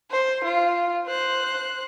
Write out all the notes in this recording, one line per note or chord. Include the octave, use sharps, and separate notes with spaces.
C5
F4
C5 F#6